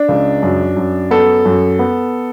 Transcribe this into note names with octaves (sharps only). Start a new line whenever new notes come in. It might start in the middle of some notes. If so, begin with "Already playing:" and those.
Already playing: D4
C#2
F#2
F#2
B3 A4
F#2
B3